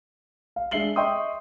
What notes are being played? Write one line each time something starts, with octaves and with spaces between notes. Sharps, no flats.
F5
G#3 D4 E5 C7 F#7 G7
D#5 E5 G5 C6 C#6 D#6